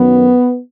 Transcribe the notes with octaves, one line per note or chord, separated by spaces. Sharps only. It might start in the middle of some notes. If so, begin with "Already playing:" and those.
Already playing: F#2 D#3 F#3 B3